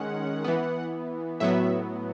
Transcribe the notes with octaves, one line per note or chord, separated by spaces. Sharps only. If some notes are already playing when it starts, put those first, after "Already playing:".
Already playing: D#3 G#3 C#4 F#5
E3 B3
A2 F#3 B3 E5